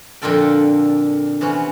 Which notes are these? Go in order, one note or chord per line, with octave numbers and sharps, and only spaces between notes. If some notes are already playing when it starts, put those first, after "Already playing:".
F2 A#2 D3 F4 A4 G5
C3 E3 B3 C#4